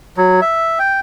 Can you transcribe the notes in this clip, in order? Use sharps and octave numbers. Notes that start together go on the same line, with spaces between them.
F#3
E5
G5